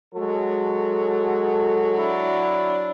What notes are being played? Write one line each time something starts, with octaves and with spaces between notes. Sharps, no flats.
F#3 G#3 F#4 A4
D4 E4